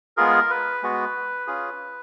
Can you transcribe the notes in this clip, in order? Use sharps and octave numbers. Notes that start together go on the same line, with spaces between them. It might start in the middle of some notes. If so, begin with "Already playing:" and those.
G#3 B3 F4 G#4 A#4
B4
G#3 B3 F#4
C#4 F4 G#4